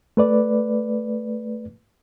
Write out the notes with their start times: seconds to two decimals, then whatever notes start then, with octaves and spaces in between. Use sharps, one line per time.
0.17 A3 B4 D5